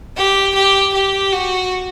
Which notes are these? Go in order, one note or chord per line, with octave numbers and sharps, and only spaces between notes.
G4
G4
G4
F#4